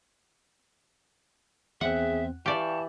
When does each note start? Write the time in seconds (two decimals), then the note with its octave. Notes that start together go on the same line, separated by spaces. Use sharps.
1.81 E2 C4 G#4 E5 F#5
2.46 E3 G4 D5 F5 G5 A5 C#6